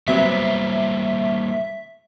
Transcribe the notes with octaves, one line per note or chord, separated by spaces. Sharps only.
C3 F#3 G3 A#3 B3 C5 E5